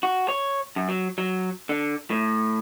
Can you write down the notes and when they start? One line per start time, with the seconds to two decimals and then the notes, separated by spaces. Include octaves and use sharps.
0.03 F#4
0.28 C#5
0.76 F#2
0.89 F#3
1.18 F#3
1.69 D3
2.10 A2